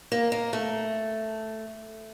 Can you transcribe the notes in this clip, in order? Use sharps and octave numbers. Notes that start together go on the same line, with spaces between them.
A#3
A#3
A3